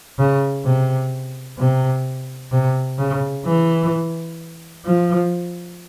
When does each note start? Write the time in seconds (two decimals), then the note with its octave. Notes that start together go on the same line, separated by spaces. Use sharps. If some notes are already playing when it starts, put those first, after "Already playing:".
0.19 C#3
0.65 C3
1.59 C3
2.52 C3
2.99 C#3
3.46 E3
4.85 F3